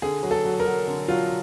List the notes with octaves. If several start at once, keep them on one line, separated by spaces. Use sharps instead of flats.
D3 G#4
F#3
A4
F#3
A#4
F#3
D3
F#3 F4